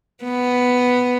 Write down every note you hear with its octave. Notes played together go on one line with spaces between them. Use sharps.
B3